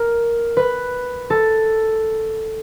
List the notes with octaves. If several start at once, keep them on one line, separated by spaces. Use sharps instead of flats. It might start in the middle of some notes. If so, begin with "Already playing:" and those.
Already playing: A#4
B4
A4